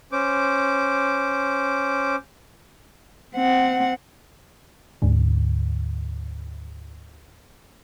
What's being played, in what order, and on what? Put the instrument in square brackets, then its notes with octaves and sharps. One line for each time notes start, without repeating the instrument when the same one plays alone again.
[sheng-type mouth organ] C#4 C5 D6
[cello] C4 F#5
[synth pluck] D2 G#2 D3